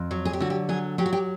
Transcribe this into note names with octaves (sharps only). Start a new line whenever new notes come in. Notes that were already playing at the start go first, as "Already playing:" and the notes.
Already playing: F2
F#3
G#4
G4
D3 F#4
G4
F#3 G#4
F#3 G4
F#4
G4